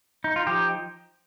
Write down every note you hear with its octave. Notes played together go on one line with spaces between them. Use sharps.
D#4
F4
F3 D#4 G4